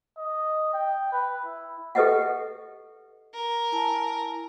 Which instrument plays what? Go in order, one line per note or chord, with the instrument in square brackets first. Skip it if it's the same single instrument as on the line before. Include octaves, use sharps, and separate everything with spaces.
[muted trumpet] D#5
G5
B4
E4
[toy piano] G4 A4 B4 D#5 E5 F#5
[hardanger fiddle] A#4
[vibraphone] E4 G#5 A5